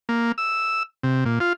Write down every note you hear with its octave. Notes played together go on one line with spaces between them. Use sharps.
A#3
E6
C3
A#2
F4